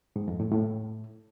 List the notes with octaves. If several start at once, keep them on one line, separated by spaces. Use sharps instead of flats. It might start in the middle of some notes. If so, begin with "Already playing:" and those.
G#2
F2
A2
A2